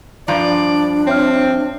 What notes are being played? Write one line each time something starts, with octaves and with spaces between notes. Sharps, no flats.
G2 F3 D4 D5 A#5
C4 C#5 E5 F6